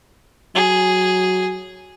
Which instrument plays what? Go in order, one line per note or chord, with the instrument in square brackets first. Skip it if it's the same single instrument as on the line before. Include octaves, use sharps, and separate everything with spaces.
[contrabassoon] F#3 [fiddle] G#4